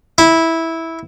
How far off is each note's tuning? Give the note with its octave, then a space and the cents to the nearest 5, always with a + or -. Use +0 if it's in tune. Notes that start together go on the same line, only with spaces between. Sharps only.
E4 -10